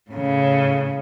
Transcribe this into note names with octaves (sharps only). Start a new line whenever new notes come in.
A2 C#3